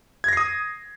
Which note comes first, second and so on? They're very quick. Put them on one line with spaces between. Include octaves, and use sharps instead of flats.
G#6 A#6 C7 D#6